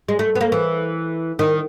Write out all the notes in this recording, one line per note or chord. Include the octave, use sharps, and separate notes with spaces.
G#3
A3
B3
A#3
E3
D#3